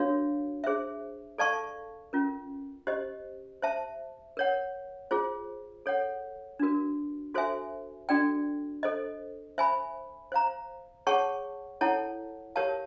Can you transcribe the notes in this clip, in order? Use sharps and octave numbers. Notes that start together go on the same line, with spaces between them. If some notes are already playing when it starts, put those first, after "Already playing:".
Already playing: D4 F#4 A#4 C#5 F5
G#4 C5 E5
A4 D5 F5 A5 C#6
C#4 F4 A#4
G4 C5 D#5
C5 E5 A5
A#4 C#5 F#5
F4 G#4 C5
A4 C#5 F#5
D4 F#4 A#4
F#4 A4 C5 E5 G#5
D4 F#4 A4 D5 G5
A4 C5 D#5
C5 E5 G#5 B5
C5 F5 A#5
G#4 C#5 F#5 A5 C#6
E4 A4 C#5 F#5 A5
G4 A#4 C#5 F5 A5